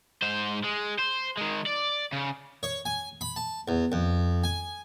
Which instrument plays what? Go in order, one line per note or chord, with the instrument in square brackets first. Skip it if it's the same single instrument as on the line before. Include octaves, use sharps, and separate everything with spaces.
[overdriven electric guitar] G#2 C5
G#3
C5
D#3 G#3
D5
C#3
[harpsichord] C#5
G#5
B5
A5
E2
F2
G#5